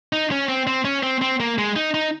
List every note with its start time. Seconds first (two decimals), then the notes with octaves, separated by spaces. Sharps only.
0.13 D#4
0.31 C#4
0.48 C4
0.67 C4
0.85 C#4
1.03 C4
1.21 C4
1.40 A#3
1.58 G#3
1.76 D#4
1.94 D#4